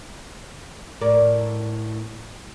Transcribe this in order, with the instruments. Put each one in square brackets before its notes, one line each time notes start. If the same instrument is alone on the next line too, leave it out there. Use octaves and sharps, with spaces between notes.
[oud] A2 A#4 D5